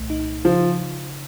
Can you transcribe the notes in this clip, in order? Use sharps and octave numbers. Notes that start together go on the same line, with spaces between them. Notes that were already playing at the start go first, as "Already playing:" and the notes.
Already playing: C2 A#2 A3
D#4
C#3 F3